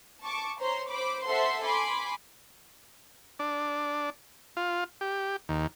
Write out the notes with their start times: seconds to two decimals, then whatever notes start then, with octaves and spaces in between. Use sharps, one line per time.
0.22 A5 C#6 D6
0.60 C5 C#5 A#5 C6
0.90 C5 B5 D6
1.26 A4 C5 E5 F#5 C6
1.63 G#5 B5 C6 D6
3.39 D4
4.57 F4
5.01 G4
5.49 D#2